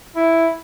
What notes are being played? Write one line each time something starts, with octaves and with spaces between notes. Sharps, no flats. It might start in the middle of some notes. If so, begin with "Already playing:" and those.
E4